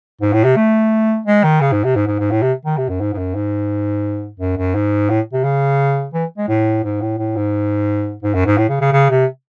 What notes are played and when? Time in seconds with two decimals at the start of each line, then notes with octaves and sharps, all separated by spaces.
0.21 G#2
0.33 A2
0.44 C3
0.56 A3
1.26 G#3
1.43 D#3
1.61 C#3
1.72 G#2
1.84 C3
1.96 G#2
2.07 G#2
2.19 G#2
2.31 A2
2.42 C3
2.66 D#3
2.77 C3
2.89 F#2
3.00 G#2
3.14 G#2
3.18 F#2
3.35 G#2
4.40 F#2
4.58 F#2
4.75 G#2
5.10 A2
5.33 C3
5.44 C#3
6.14 E3
6.38 G#3
6.49 A2
6.84 G#2
7.01 A2
7.18 A2
7.36 G#2
8.23 G#2
8.35 F#2
8.46 G#2
8.57 A2
8.69 C#3
8.81 C#3
8.92 C#3
9.10 C3